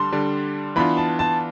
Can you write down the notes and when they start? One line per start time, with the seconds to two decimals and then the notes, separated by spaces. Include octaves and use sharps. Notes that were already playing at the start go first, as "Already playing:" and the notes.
Already playing: D3 G3 D4 C6
0.12 D3 G3 D4
0.76 E3 B3 D4 F4 B5
0.97 A5
1.19 A5